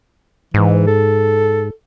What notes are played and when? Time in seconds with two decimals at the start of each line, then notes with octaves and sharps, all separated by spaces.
0.54 G#2 E3
0.87 A4